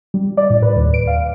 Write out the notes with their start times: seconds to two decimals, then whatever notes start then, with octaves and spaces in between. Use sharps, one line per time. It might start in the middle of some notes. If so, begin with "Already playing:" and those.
0.14 G3
0.37 D5
0.50 A2
0.62 B4
0.76 D#2
0.94 D7
1.07 F5